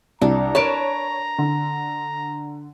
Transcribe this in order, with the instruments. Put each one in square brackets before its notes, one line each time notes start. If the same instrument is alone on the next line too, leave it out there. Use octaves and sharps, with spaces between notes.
[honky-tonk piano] C2 [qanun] D4 [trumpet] A#5
[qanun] A#4 B4 A5 [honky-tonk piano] C#5 D7
[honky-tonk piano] D3